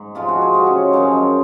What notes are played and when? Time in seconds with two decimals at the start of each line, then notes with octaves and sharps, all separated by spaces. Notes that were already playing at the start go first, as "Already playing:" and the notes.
Already playing: G#2 D#4
0.15 C3 F3 G#3 F4
0.29 F#4
0.42 G#4
0.54 C3 F3 G#3 F#4
0.67 C#4
0.93 F#2 F3 G#3 D#4